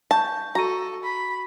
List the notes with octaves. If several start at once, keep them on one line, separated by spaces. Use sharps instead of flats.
A5 C#6 G6
F#4 A4 A#5 C#6 D#7
B5